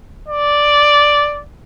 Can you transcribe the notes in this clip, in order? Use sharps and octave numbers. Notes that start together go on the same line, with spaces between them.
D5